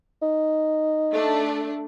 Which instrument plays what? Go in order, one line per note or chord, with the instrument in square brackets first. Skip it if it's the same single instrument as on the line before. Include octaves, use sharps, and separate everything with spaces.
[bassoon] D#4
[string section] A3 D4